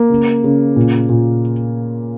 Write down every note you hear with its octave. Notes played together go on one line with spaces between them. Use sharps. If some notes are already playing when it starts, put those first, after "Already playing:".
Already playing: A#3
C#3
C#3
A#2
A#2